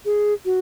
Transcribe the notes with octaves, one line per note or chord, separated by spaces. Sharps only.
G#4
F#4